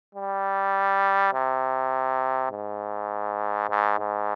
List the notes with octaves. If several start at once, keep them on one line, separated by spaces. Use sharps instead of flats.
G3
C3
G#2
G#2
G#2